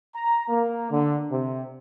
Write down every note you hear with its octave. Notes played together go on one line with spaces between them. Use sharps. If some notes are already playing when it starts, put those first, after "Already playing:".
A#5
A#3
D3
C3